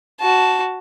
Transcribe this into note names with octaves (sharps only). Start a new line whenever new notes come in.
F#4 A5